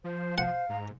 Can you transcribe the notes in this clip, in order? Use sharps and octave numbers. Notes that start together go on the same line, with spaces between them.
F3 C5
C5 F5 F#5
G#2 A#5